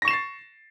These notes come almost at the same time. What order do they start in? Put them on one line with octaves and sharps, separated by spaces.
A#6 C#6 E7 C7 A6